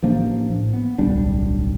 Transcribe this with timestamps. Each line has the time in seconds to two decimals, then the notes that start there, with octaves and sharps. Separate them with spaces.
0.02 A1 F3 A#3 D4
0.50 A2
0.73 B3
0.98 D1 B1 G3 D4